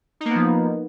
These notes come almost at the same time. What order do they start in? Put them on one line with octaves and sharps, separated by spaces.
D#4 A#3 B3 F3